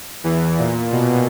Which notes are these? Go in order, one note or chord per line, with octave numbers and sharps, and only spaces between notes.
E2 E3
A#2
B2